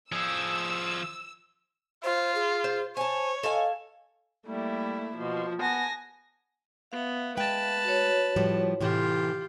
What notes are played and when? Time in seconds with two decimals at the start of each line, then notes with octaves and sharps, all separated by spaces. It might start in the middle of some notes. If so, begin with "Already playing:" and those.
0.12 F3 G#4 E6
2.04 F4 C5
2.35 G#4
2.64 C5
2.97 C5 C#5 G#5 A5
3.43 A4 D#5 F5 G#5
4.46 G3 A3 A#3 E4
5.17 B2 F3
5.60 B3 G#5 A5 A#6
6.92 B3 E5 F5
7.37 G#3 B4 G5 A5
7.84 F#4 C#5
8.36 A2 F3 G3
8.80 A2 C3 E3 F4 G4 C6